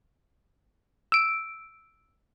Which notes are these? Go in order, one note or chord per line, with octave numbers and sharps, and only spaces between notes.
E6 D7